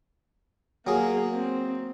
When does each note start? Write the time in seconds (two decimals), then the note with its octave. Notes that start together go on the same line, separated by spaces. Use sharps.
0.87 F#3 A#3 G#4
1.32 C4